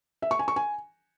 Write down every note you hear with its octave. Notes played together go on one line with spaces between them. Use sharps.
E5
C#6
G#5
C#6
G#5